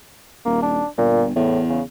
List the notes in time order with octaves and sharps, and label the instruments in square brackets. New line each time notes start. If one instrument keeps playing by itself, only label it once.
[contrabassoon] D#1 [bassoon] A#3
[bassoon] D4
[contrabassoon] G1 [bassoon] A#2
[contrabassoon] E2 [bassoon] A2
[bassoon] C#3